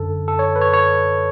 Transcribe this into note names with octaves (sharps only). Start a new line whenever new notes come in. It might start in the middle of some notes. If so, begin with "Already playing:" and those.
Already playing: F#2 D3 A4
A4
C#5
B4
C#5
C#5